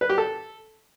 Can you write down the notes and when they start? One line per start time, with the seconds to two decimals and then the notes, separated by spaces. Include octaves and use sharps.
0.01 B4
0.09 G4
0.18 A4